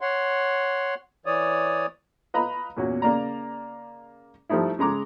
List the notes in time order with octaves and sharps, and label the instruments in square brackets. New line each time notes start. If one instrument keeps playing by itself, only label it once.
[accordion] C#5 F#5 C6
E3 C#5 D5 D#6
[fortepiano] B4 D#5 F5 A#5 B5
E2 A#2 C#4 F#4
C#3 A#3 D5 A#5
F3 G3 A3 D#4 E4
C#3 G#3 A#5 D6